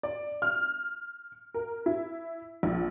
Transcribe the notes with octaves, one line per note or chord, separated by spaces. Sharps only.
D5
F6
A#4
E4
A#1